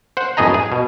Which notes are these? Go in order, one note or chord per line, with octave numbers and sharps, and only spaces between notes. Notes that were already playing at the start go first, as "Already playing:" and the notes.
C5 F#5
F#2 A2 B3 G#4 D#5 A#5
G#4
B2